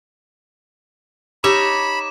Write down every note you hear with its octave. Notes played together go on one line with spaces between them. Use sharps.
D#4 G4 C#5 B5 D6 E7